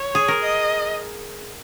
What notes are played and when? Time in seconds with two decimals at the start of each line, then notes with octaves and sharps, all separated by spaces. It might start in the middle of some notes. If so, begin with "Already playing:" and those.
Already playing: C#5
0.15 G#4
0.28 A#4
0.42 D#5